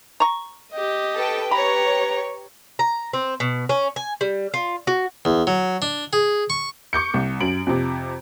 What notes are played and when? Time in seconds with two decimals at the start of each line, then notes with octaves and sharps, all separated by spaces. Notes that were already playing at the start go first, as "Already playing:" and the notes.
0.20 A#5 C#6
0.71 G4 D#5
1.16 A4 B4 G5
1.51 G4 B4 C#5 A#5 B5
2.79 A#5
3.13 C4
3.40 B2
3.69 C#4
3.96 G#5
4.21 G3
4.54 F4
4.87 F#4
5.25 E2
5.47 F#3
5.82 D4
6.13 G#4
6.50 C#6
6.93 C#6 D6 G6 C#7
7.14 C2
7.40 F#2 D7 F#7
7.67 F2 C3